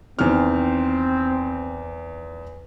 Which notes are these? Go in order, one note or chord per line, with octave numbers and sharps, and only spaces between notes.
E2 D#3 C4 F6